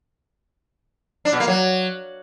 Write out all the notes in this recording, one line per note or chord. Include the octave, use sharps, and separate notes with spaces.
D4
B2
A#3
F#3